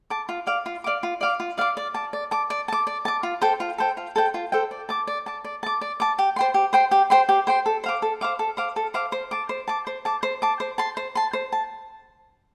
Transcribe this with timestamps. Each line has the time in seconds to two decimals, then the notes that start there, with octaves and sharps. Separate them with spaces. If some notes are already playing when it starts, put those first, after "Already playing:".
0.10 A5 D6
0.29 F4
0.47 D5 F5 D6
0.66 F4
0.84 D5 F5 D6
1.03 F4
1.21 D5 F5 D6
1.40 F4
1.58 D5 F5 D6
1.77 D5
1.94 A5 D6
2.13 D5
2.31 A5 D6
2.50 D5
2.68 A5 D6
2.87 D5
3.05 A5 D6
3.23 F4
3.42 A4 C5 G5
3.60 F4
3.78 A4 C5 G5
3.97 F4
4.16 A4 C5 G5
4.34 F4
4.52 A4 C5 G5
4.71 D5
4.89 A5 D6
5.07 D5
5.26 A5 D6
5.44 D5
5.63 A5 D6
5.81 D5
6.00 A5 D6
6.19 G4
6.36 C5 G5 C6
6.54 G4
6.73 C5 G5 C6
6.91 G4
7.10 C5 G5 C6
7.29 G4
7.47 C5 G5 C6
7.66 A4
7.84 C5 F5 D6
8.02 A4
8.21 C5 F5 D6
8.39 A4
8.57 C5 F5 D6
8.76 A4
8.94 C5 F5 D6
9.12 C5
9.31 A5 D6
9.49 C5
9.68 A5 D6
9.87 C5
10.05 A5 D6
10.23 C5
10.42 A5 D6
10.60 C5
10.78 A5 C6
10.97 C5
11.15 A5 C6
11.33 C5
11.52 A5